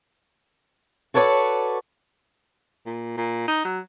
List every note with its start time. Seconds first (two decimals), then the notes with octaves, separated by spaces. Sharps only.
1.14 F#4 A4 B4 C#5 D5
2.86 A#2
3.17 A#2
3.48 D#4
3.65 F#3